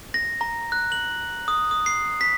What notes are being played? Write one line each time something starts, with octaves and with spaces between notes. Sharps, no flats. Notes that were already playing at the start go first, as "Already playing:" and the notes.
A#6
A#5
F#6
F#7
D#6
D#6
C7
B6